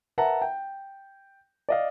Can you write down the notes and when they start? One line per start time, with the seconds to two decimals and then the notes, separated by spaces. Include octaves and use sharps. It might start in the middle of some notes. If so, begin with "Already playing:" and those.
0.18 A#4 B4 E5 F#5 A5 A#5
0.42 G5
1.69 D5 D#5 F5